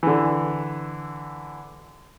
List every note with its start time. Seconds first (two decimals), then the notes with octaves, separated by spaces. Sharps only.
0.03 D3 E3